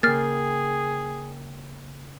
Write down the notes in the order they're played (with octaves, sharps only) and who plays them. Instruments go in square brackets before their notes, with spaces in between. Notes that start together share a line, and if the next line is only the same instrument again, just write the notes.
[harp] C#3 G5 C7 [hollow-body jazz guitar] A#3 [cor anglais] G#4 [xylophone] F6 A6